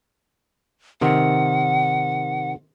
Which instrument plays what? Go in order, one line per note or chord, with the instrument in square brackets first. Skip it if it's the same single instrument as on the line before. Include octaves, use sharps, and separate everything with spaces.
[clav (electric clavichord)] C3 D#3 [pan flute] F#5